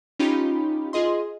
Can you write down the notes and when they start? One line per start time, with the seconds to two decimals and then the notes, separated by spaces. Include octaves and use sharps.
0.19 C#4 D#4 F4 G4 B5
0.93 F4 G#4 D#5 C6